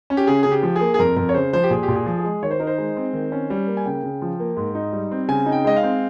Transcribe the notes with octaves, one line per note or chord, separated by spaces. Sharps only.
C#4
G4
C#3 G#4
C#3 G#4
G4
F3
G#4
A#3
G#4
F2 A#4
F2 A#4
C#5
C#3 C5
F3 C5
G4
A#2 G#4
G4
A#2
G#4
F3
G#4
G#3
D#3 C#5
C5
D#4 A#4
C5
G#3
C4
D#3
C#4
G3
A#3
G#5
C#3 G5
C#3
F3
A#3
G#2
D#4
G3
C4
C#3 G#5
D#4
G5
G#3 D#5
F5
C4